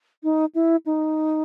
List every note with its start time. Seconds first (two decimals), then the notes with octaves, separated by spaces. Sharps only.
0.23 D#4
0.55 E4
0.86 D#4